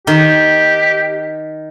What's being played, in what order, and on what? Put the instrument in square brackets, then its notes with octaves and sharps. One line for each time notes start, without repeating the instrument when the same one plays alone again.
[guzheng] D#3 [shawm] G4